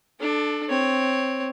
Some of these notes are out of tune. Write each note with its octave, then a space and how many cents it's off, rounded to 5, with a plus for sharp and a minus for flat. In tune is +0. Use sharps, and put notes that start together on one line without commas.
D4 +20 A4 -10
C4 +0 C#5 +0